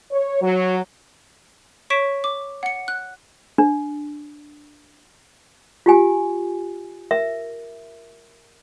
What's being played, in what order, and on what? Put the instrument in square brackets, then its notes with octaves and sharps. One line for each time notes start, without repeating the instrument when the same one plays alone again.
[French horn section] C#5
F#3
[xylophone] C#5 C#6 B6 D7 E7
D6
F#5 C#7
F#6
[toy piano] D4
F4 G4 G#5
A#4 E5